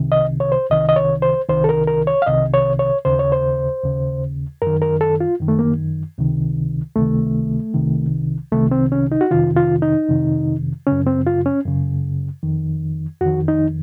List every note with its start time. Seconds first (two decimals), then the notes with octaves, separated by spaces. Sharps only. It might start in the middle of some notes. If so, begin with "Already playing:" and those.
Already playing: C2 C3 D#3
0.12 D#5
0.40 C#5
0.52 C5
0.71 C2 C3 D#3 D#5
0.89 D#5
0.96 C#5
1.22 C5
1.49 C2 C3 D#3 C5
1.64 A4
1.69 A#4
1.88 A#4
2.07 C#5
2.22 F5
2.26 C2 C3 D#3 D#5
2.54 C#5
2.79 C#5
3.05 D#2 C#3 C5
3.19 C#5
3.32 C5
3.83 D#2 C#3
4.62 F#2 D#3 A#4
4.82 A#4
5.01 A4
5.20 F4
5.40 F#2 D#3
5.48 A3
5.59 A#3
6.18 C#2 C3 D#3
6.96 C#2 C3 D#3 A3
7.74 C2 C3 D#3
8.52 C2 C3 D#3 A3
8.71 C4
8.92 C#4
9.12 D#4
9.21 F#4
9.31 F2 C3 D#3 F4
9.57 F4
9.82 D#4
10.09 F2 C3 D#3
10.87 F#2 C#3 C#4
11.07 C4
11.26 F4
11.46 C#4
11.65 F#2 C#3
12.43 F2 D#3
13.21 F2 D#3 F#4
13.48 D#4